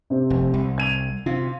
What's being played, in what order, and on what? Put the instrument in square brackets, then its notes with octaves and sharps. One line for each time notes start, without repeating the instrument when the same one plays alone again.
[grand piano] C3 C4
[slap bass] F1
C2
[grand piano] G#6 D#7 F7
[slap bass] C3 [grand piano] F4